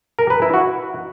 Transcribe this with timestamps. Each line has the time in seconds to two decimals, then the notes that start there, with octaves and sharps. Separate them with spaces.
0.19 A#4
0.30 B4
0.42 E4
0.54 F#4